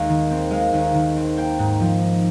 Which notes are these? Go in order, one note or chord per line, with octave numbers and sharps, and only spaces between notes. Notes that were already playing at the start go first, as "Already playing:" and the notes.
Already playing: D#2 G#3 F5
D#3
C4
G#3 F5
D#2
D#3
C4
A#3 G5
G#2
F3
D#4